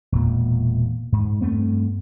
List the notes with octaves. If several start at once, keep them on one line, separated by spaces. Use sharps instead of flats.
E1 A#2
G#2
G2 A3 B3 C4